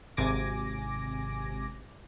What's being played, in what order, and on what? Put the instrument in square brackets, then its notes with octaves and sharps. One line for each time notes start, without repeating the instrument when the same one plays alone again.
[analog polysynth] G#1 C3 G#5 D6 A#6